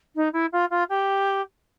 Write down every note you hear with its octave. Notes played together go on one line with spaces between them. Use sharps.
D#4
E4
F4
F4
G4